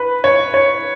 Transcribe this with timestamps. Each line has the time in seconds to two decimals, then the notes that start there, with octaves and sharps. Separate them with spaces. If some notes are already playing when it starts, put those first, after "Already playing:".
Already playing: B4
0.24 C#5
0.54 C#5